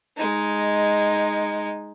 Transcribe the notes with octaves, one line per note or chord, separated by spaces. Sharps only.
G#3 D#4